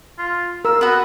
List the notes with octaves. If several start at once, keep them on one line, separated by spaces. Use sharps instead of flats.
F4
A#4 E6
B3 F#4 B4